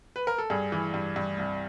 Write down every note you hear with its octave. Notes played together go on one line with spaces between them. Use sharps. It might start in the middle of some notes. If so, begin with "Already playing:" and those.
B4
A#4
A4
G2 G#4
E3
G2
G2
C2